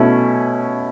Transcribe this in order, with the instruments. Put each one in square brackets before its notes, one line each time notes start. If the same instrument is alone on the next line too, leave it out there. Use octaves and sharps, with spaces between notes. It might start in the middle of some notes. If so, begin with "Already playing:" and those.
Already playing: [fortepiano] B2 A3 C#4 E4